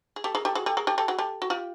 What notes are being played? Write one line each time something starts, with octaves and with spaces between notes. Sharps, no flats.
G#4
G4 A4
G#4 A#4
G4 A4
F#4 G#4
G4 A4
G#4 A#4
G4 A4
G4 A4
F#4 G#4
G4 A4
F#4
F4 G4